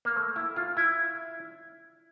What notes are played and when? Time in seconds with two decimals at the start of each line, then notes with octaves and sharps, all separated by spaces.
0.05 A#3
0.16 A3
0.36 E4
0.56 F4
0.77 E4